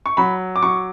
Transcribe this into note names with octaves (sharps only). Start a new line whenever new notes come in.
C#6
F#3 B5
D6
F#3 C#6